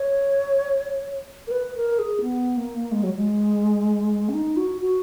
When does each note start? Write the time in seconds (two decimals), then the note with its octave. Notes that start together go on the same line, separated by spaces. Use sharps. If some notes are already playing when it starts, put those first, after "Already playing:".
Already playing: C#5
1.47 A#4
1.51 B4
1.75 A#4
1.99 G#4
2.22 B3
2.57 A#3
2.92 G#3
3.03 F#3
3.15 G#3
4.29 C#4
4.34 D#4
4.57 F#4
4.81 F#4